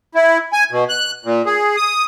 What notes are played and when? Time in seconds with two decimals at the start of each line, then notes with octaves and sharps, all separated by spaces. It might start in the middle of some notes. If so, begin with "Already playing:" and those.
0.15 E4
0.53 G#5
0.71 B2
0.89 F#6
1.25 A#2
1.46 G#4
1.77 D#6